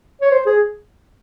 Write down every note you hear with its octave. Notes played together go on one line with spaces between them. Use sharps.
C#5
C5
G#4